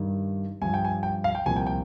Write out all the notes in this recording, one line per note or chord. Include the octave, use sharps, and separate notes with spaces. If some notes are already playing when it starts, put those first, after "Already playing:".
Already playing: G2 D#3
G2 F3 G#5
G5
G#5
G5
F5
G5
C2 A#2 F3 G#5
G5
G5